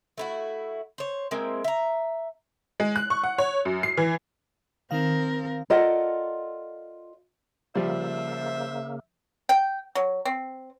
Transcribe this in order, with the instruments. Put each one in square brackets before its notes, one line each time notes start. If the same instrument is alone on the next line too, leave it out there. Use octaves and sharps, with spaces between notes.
[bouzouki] A3 E4 F#4
C5 C#5
G#3 A#3 C4 E4
E5 A#5
[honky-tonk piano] G#3
F#6
C#6
F#5
C#5
F#2
C7
E3
[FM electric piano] D#3 F5 [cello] C4 A#4
[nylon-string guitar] F4 A4 A#4 D5 D#5 F#5
[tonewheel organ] C#3 A#3 [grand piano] F3 G3 [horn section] C5 E5
[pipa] G5
F#3
C4